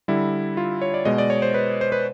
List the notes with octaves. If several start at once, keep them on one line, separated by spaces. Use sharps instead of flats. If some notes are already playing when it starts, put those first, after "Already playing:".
D3 G3 E4
F4
C#5
D5
B2 G#3 D#5
D5
C#5
C5
B4
C5
B4